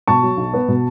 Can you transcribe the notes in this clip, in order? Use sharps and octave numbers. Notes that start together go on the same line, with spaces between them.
B2 A5 C#6
F#3
B1
B3
B2